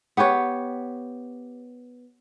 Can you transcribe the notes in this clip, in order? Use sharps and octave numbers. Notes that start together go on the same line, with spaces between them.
B3 G4 B4 C#5